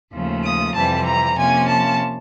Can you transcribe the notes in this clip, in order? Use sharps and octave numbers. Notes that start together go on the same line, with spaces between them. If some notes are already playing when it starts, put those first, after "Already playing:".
D#2 C#3 F3 A3
D#6
F2 C3 E3 G3 C4 A5
A#5
C3 F3 A#3 C#4 G#5
A5